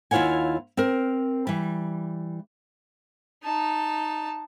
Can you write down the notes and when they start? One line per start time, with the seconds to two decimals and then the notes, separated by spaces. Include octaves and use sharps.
0.11 D#2 E4 F4 C#5 F#5 G#5
0.77 C4 A#4
1.47 E3 G3
3.44 D#4 A5